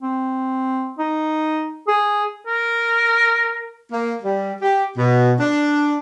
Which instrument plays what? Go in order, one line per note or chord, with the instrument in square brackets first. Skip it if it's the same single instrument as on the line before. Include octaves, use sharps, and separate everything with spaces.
[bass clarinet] C4
D#4
G#4
[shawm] A#4
[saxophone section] A#3
G3
G4
B2
D4